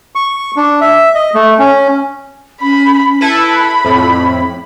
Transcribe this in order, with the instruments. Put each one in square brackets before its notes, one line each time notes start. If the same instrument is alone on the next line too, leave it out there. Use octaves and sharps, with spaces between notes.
[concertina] C#6
D4
E5
D#5
A3
C#4
[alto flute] C#4 [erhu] B5
[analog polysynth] E4 A4 B4 [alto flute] A5 [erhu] B5
[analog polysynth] F2 A2 [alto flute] C4